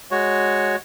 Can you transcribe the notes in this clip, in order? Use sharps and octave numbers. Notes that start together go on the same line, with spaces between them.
G#3 F#4 C#5